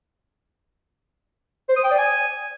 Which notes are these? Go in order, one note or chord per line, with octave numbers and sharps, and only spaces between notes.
C5
D#6
G5
D5
G#5